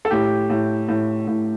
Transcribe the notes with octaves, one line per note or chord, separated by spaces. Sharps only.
A4
A2 G4
A2
A2
A2